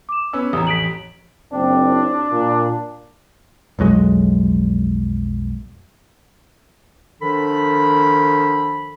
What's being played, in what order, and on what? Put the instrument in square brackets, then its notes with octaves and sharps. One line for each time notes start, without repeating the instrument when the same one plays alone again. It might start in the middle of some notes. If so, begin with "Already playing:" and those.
[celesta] D6 E7
[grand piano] B3 C#4 B4 [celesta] E6
[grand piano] A1 F2 [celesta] A#5 D#6
[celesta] B6 D7 F#7
[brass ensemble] F#1 C4 [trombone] D4
[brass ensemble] A#2
[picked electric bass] B1 F2 F#3 G#3
[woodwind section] D#3 F3 D4 A4 B5